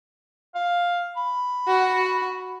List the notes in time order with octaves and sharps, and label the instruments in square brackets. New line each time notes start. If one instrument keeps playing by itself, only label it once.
[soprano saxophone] F5
B5
[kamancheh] F#4